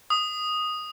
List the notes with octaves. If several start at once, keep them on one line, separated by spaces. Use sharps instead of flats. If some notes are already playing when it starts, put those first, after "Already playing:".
D#6